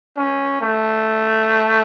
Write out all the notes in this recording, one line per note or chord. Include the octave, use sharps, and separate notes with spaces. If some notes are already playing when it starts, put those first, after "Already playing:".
C#4
A3